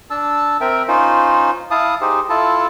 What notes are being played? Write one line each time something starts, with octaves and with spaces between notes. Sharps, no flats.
D4 A5 E6
C4 A#4 E5 G5
C#4 D#4 F4 C5
E4 F5 A5 D#6
D#4 G4 G#4 C5
E4 F4 A4 A5